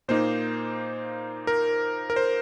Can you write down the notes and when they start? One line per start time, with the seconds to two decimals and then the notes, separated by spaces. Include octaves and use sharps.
0.08 A#2 A#3 D#4 C5
1.47 A#4
2.10 A#4
2.16 C5